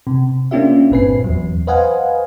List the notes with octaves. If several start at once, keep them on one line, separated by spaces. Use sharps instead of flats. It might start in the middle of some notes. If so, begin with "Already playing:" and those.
C3
A#3 C#4 D4 F4 G4 E5
G1 A#2 C4 B4 G#5 C7
E2 F#3
B4 C5 D#5 F5 F#5 G#5